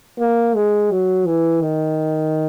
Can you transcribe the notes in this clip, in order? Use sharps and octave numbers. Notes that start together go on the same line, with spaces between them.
A#3
G#3
F#3
E3
D#3